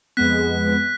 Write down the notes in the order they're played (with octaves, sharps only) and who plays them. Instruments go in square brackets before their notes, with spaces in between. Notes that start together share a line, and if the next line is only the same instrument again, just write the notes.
[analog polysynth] F2 G#3 B3 [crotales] F#6 B6